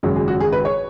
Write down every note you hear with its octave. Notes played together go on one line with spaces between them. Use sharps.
G#1 F#2 C#3 F#3 G#4
G#4
F#4
G#4
B4
C#5